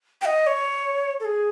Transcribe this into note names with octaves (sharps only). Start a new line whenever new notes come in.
G5
D#5
C#5
A4
G#4